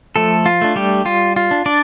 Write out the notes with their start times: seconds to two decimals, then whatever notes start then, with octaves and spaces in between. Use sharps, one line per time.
0.16 F3 A3 A4
0.46 F4
0.61 A3 D4
0.76 G3 G4
1.05 G3 F4
1.36 F4
1.51 D4
1.66 D4 D5